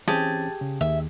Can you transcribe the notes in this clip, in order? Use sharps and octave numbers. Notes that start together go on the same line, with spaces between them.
E3 C4 C#4 G4 G#4 A5
C#3
D#2 D#3 E5